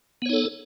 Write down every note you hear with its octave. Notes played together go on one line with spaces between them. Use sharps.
B3 D#4 A4 C#5